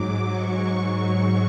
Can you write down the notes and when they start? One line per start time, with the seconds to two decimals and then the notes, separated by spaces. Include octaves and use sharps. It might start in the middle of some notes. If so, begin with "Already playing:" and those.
Already playing: G#2 F#3 D6
0.28 G#2 F#3 C#6